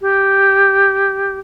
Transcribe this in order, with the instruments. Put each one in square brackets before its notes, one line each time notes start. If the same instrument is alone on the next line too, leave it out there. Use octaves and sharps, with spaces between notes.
[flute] G4